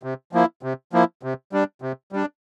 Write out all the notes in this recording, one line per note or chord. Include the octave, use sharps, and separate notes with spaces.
C3
F3 A#3 E4
C3
F3 A#3 E4
C3
G3 D4
C3
G3 D4